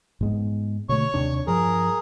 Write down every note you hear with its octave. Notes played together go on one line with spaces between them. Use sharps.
G#2 G#3 B3
B2 D3 A3 C#5 C#6
D#2 C3 D4
G2 F3 G#4 A#4